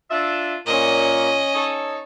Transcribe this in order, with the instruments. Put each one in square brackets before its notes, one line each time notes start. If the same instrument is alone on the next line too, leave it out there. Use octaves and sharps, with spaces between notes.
[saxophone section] D4 F4 E5
[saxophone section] A#2 [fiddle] C#4 D#5
[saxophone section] D#4 A4 C#5